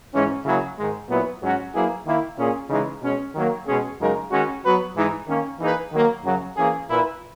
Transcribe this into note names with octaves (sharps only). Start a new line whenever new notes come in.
G#2 E3 G#3 C#4
C#3 F#3 A#3 E4 G#4
G#2 D#3 G#3
A#2 F#3 B3 E4 B4
G#2 F#3 C#4 F#4
F#3 A#3 E4 G#4 B4
D#3 A#3 E4
A#2 A#3 C#4 G#4
C#3 E3 G#3 D#4
B2 G#3 C#4
D#3 F#3 A#3
B2 G#3 C#4 G#4
F#2 C#3 G#3 D#4 A#4
D#3 G#3 C#4 F#4
F#3 B3 F#4 B4
G#2 E3 G#3 D#4
D#3 A#3 C#4
E3 A#3 D#4 G#4 B4
D#3 F#3 A#3
F#2 C#3 F#3
E3 A#3 C#4 G#4
A#2 A#3 E4 B4